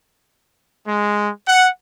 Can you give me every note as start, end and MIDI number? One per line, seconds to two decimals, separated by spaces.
0.87 1.30 56
1.47 1.69 78